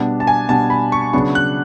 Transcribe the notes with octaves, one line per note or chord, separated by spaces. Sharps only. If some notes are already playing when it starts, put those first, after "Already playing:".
Already playing: B2 G3 B3 D4
A5
G#5
B2 G3 B3 D4 A5
B5
C#6
C#3 F#3 B3 D4 C#6
F#6